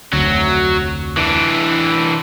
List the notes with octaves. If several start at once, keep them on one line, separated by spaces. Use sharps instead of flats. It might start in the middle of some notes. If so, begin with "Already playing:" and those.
F1 D2 F#3
E3 D4